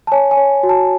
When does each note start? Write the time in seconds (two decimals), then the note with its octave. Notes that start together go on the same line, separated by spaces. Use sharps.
0.07 A5
0.12 C#5 G#5
0.31 G#5
0.37 C#5
0.63 F#4
0.69 A5